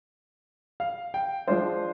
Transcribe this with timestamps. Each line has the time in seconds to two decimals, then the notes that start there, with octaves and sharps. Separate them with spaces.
0.80 F5
1.14 G5
1.48 F3 G#3 D4 F4 C5